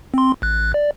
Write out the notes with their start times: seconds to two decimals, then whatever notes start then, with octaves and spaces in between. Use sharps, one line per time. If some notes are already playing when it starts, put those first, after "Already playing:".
0.14 C4 C6
0.42 A1 F#6
0.74 D5